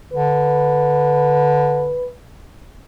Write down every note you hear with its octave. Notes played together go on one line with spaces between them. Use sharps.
D3 B4